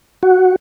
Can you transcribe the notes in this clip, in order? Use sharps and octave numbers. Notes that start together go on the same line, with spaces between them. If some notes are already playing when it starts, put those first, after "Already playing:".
F#4